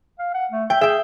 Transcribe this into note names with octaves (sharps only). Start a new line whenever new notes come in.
F5
F#5
A3
E5 G5
G#4 E5 G5